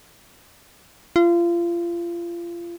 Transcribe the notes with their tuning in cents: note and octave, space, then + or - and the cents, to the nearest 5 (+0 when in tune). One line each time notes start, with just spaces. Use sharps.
F4 -30